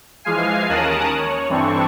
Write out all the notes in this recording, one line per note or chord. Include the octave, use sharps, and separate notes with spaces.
E3 F3 G#3 F5 G#5 C7
D#2 C#4 A#4 A5 D#6 F#6
C#5
G2 E3 C4 D4 A4 C#6